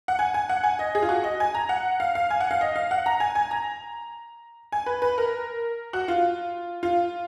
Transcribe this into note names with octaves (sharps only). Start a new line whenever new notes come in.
F#5
G#5
G#5
F#5
G#5
D#5
G#4
F4
F#4
D#5
G#5
A#5
F#5
F5
F5
G#5
F#5
F5
D#5
F5
F#5
A#5
G#5
G#5
A#5
G#5
B4
B4
A#4
F#4
F4
F4